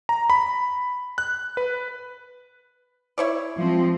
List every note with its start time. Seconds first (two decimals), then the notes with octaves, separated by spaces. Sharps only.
0.09 A#5
0.30 B5
1.18 F#6
1.57 B4
3.18 E4 C#5 D5
3.58 F3 G#3 C4